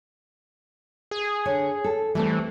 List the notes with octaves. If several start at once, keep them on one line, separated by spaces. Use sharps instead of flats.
G#4
D3 C#5
A4
E3 G3 A3 C4